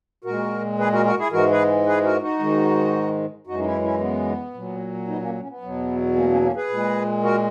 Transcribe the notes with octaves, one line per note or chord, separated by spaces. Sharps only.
A#2 G#3 F#4 A#4
G#4 B4
F#4 A#4
F#4 A#4
E4 G#4
G#2 E3 G#3 F#4 A#4
G#4 B4
G#4 B4
F#4 A#4
D#4 F#4
G#2 D#3 G#3
F#2 E3 G#3 D#4 F#4
D#4
C#4 E4
C#4 E4
B3
A#2 F#3
B3 D#4
A#3 C#4
C#4
B3
E2 B2 F#3
A#3 C#4
A#3 C#4
A#3 C#4
G#4 B4
A#2 G#3
F#4 A#4